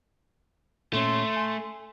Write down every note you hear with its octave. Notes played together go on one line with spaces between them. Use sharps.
A#2 A3 C#4 C#5 C6
G#5